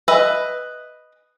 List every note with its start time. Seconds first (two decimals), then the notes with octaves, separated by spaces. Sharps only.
0.08 B4 D#5 E5